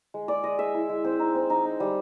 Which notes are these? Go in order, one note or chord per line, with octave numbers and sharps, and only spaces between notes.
G#3
G#3 D5
G#3 D#5
G#3 E5
E4
G#3
C4 C5
D#4
C4
D#4
D#4
G3